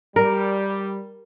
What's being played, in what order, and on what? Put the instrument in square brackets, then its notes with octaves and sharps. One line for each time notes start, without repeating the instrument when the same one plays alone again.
[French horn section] G3 [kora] A#4